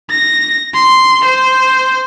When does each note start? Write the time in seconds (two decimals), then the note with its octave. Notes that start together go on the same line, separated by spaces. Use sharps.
0.11 A#6
0.75 C6
1.25 C5